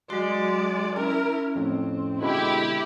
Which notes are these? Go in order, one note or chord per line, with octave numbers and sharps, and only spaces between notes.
F#3 G#3 F#4 D5 C6
C#4 E4 A#4
F2 A2 C4
B2 D3 G#3 E4 G4